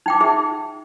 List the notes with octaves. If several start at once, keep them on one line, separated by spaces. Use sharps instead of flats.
D#4 G5 D6
D#4 G#4 E5